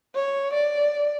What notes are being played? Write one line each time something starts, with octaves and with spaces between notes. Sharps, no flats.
C#5
D5